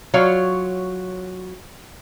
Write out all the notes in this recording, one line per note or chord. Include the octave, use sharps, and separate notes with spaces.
F#3 F4 C#5 F5